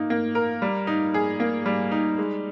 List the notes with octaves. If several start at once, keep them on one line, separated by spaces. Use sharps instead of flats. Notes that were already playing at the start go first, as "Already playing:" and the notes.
Already playing: A#3 D#4
A#3
A#4
G3
D#4
G#4
A#3
G3
D#4
G#3